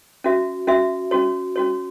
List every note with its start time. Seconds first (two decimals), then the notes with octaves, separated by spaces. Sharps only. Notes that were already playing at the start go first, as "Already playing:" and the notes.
0.24 C#4 F#4 E5
0.67 C#4 F#4 E5
1.11 C#4 F#4 C#5
1.56 C#4 F#4 C#5